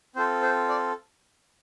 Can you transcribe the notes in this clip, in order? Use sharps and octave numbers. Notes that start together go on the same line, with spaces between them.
C4 F4 A4 C5
C5
D5